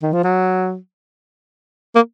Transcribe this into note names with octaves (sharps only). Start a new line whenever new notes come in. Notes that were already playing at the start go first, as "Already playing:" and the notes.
D#3
F3
F#3
A#3